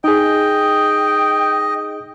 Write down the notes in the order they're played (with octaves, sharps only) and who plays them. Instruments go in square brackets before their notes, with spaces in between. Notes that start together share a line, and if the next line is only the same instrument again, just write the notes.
[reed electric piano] D#4 G#4 [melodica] D#5 [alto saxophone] G5